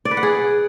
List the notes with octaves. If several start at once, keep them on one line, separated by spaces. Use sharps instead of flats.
D5
B4
F#5
G#4